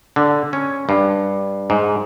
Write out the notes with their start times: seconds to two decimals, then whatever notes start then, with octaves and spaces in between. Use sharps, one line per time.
0.16 D3
0.53 C#4
0.89 G2
1.70 G#2